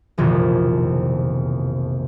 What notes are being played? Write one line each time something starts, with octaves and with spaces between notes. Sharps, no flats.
E1 A#1 F2 C3 D#3